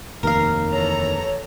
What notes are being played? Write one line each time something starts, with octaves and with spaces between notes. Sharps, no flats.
F1 D#2 A#4 F5
E3 A4 C#5 A#5